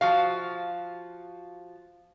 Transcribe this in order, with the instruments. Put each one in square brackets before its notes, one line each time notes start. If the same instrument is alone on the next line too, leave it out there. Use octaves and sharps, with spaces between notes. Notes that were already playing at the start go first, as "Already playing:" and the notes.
[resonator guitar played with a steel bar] F3 F#4 F5